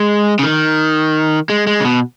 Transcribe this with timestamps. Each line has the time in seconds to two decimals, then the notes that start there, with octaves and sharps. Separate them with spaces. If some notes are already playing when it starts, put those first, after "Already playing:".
Already playing: G#3
0.39 C#3
0.43 D#3
1.49 G#3
1.67 G#3
1.81 C#3
1.85 B2